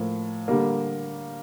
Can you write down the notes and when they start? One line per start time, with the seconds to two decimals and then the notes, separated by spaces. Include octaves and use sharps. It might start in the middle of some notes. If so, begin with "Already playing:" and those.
Already playing: A2 F3 A#3
0.48 D3 G3 A#3